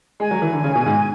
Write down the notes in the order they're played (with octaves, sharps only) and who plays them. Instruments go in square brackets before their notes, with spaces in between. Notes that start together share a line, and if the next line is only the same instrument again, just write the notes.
[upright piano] G#3 [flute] G#5
[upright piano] F#3
E3
D3
C#3
B2
G#2